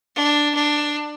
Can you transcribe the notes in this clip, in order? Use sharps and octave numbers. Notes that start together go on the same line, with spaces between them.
D4
D4